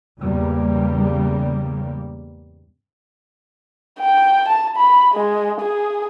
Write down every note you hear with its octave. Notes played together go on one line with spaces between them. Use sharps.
E2 G#2 C#3 G3 A#3
G5
A5
B5
G#3
G#4